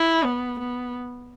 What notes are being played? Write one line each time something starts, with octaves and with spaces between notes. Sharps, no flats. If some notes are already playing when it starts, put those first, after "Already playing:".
Already playing: E4
B3
B3